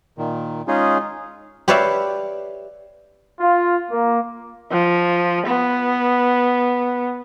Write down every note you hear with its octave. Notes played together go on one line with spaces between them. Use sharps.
A#2 D#3
G#3 C#4 D#4 F4 G#4
G4 B4 C#5 D5 E5 F5
F4
A#3
F3
B3